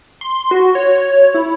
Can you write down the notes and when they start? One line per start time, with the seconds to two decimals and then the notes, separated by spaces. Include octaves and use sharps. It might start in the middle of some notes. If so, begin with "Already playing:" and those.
0.21 C6
0.51 F#4
0.75 C#5
1.34 E4